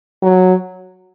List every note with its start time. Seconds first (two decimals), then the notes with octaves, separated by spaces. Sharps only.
0.22 F#3